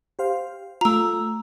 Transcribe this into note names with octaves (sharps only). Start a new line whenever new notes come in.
G4 C5 F5
A3 F4 A#5 E6